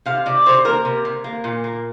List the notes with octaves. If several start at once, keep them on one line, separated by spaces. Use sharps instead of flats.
C3 F5
C3 D5
C3 C5
A#3 A#4
C3
C3
A#3
A#2
A#3